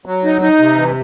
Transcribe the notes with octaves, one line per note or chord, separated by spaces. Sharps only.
F#3
D#4
D#4
C3
E3